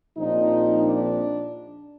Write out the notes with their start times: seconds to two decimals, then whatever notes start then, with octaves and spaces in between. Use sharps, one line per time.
0.17 A#1 A#2 F3 C4 D#4
0.84 D4